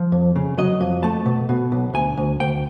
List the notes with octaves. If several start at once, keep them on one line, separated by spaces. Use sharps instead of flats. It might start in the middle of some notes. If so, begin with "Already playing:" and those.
Already playing: F3
F2
C#3
F#3 D#5
F2
A3 A5
B2
B2
B1
D2 G#5
D2
D2 G5